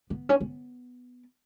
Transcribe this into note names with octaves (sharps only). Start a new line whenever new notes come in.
B3
C#4
B3